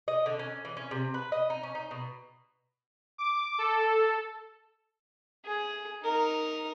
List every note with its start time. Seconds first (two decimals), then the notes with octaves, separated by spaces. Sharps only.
0.08 D#5
0.26 D3
0.39 C#4
0.65 E3
0.77 C#4
0.91 C3
1.14 B4
1.32 D#5
1.50 D#4
1.63 C#4
1.75 D#4
1.91 B2
3.18 D6
3.58 A4
5.45 G#4
6.03 D#4 A#4